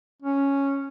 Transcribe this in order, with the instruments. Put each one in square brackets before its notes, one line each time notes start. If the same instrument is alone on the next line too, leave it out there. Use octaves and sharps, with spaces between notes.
[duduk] C#4